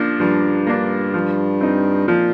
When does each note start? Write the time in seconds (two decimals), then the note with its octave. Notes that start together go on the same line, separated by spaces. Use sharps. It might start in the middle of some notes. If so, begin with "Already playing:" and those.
Already playing: F3 A#3 D4
0.20 G2 F3
0.67 A#3 D4
1.14 F3
1.61 C4 D#4
2.08 A#2 F3